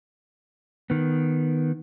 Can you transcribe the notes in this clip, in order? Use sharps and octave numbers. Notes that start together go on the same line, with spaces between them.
D#3 B3